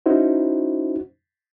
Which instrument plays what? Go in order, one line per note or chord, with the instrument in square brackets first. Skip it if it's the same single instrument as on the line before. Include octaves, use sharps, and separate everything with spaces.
[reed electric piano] C#4 D#4 E4 F#4 C5